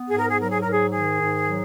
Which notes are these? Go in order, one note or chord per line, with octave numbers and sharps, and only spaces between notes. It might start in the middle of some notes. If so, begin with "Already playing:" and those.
Already playing: B3
G#2 G#4
A#4
G#4
F#3 A#4
G#4
G#2 A#4
G#4
D#3 G#4
G#2
F#3